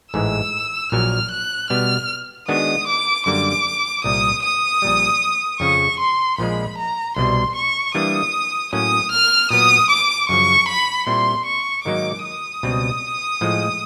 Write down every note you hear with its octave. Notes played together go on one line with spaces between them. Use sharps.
A1 G#2 E3 G#3 E6
A#1 A#2 F#3 F6
F#6
B2 G3 B3 F6
D#3 G#3 B3 D4 F#4 D#6
D6
F#2 D3 G3 A#3 D6
C2 A#2 G3 D#6
D#6
A#1 A#2 G3
F2 C#3 F3 C#6
C6
A#1 A#2 F3 G#3 B5
A#5
C2 B2 G3 C6
C#6
E3 G3 A#3 D4 D#6
A2 F#3 A#3 C#4 D#6
F6
A#2 F#3 B3 D#6
D6
F#2 C#3 F3 C#6
B5
A#2 G3 C4 E4 C6
C#6
G#2 D#3 F#3 A#3 D#4 D6
D#6
C#2 B2 G3 C4
A2 F3 G#3